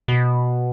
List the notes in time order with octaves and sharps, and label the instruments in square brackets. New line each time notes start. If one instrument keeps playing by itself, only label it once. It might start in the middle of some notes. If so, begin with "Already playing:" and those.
[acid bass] B2